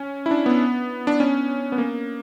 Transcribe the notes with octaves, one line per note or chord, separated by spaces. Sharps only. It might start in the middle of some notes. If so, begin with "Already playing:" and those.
Already playing: C#4
E4
D4
B3
D4
C#4
B3
A#3